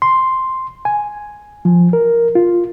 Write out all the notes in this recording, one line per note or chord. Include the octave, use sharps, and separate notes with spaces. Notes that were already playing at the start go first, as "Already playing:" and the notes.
C6
G#5
F3
A#4
F4